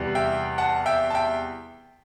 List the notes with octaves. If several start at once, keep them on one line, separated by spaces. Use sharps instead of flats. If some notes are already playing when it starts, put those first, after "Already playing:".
Already playing: E2 C3 G3 B3
E5 G5
F#5 A5
E5 G5
A5
E5 G5